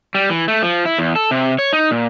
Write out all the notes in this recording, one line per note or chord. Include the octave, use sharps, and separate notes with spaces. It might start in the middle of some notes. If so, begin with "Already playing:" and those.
G3
E3
A3
F3
E4
E2
A4
C3
C#5
D#4
A#2